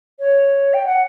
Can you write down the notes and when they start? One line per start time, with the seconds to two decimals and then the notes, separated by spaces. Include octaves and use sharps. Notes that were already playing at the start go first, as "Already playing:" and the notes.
0.19 C#5
0.73 G5
0.85 F#5